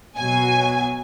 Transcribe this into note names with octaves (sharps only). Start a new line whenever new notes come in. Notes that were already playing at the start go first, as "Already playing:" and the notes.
B2 F#3 G#5